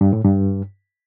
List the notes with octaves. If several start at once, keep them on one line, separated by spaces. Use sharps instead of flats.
G2
A2
G2